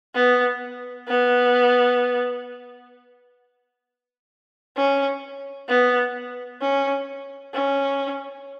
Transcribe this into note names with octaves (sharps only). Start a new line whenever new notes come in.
B3
B3
C#4
B3
C#4
C#4